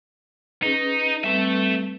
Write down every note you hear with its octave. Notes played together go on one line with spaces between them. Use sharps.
C#4 D#4 G#4 B4
G3 A3 C4 B4 E5